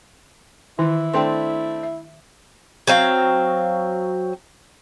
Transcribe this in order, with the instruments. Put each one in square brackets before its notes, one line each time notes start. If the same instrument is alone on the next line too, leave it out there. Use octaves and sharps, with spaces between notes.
[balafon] D#3 [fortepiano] E3 [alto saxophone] E4
[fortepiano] A3 C4 D4 [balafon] G5 C6
[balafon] E5
[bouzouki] F#3 C4 F5